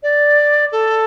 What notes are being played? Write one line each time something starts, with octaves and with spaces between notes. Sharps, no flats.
D5
A4